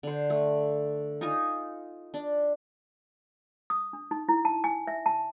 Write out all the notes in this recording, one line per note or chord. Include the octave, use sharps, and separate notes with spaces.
D3 C5
A3
D#4 F4 D#5 G#5
D4
D#6
D4
D#4
E4
A5
G#5
E5
A5